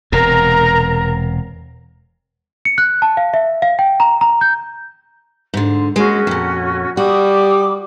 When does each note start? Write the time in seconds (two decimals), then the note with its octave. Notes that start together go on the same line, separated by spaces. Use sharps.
0.12 E1 C3 A#4 A#5
2.65 C#7
2.78 F#6
3.02 A5
3.17 F5
3.34 E5
3.62 F5
3.79 G5
4.00 A#5
4.21 A#5
4.41 G6
5.54 G#2 D3 C6
5.96 G#3 A#3 C#4 F#4
6.27 F2 A#2
6.97 G3 F#4 D6 D#6